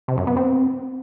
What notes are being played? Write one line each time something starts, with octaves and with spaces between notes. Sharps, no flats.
C3
F#2
B3
C4